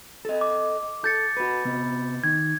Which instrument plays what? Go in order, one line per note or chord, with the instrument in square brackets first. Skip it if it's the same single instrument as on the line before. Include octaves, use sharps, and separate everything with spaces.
[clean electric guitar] A4 D#5
[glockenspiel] D6
[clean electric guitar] A4 [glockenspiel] G6 A6 C#7
[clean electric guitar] F#4 B4
C3 B3
[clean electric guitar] D#3 [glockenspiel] G#6